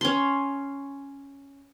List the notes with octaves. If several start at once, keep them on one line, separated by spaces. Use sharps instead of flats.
C#4 C6